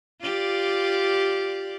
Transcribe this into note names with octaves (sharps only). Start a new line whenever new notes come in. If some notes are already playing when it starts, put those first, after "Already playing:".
F4 G4 D5